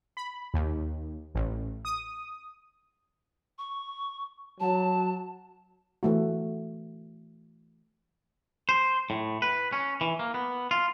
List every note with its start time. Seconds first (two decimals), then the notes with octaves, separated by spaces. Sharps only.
0.17 B5
0.54 D#2
1.35 A1
1.85 D#6
3.59 C#6
4.60 F#3 A5
6.03 E3 A3 F#4
8.69 C5
9.10 A2
9.42 B4
9.72 C#4
10.01 E3
10.19 A#3
10.34 B3
10.71 F4